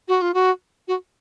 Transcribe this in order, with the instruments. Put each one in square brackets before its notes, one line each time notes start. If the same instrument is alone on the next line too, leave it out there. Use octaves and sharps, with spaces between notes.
[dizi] F#4
F4
F#4
F#4